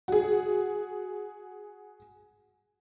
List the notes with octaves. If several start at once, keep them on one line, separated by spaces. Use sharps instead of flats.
F#4 G#4